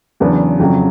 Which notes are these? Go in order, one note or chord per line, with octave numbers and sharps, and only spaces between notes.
E2 C#3 F#3 B3 D4
F2 C#3 F#3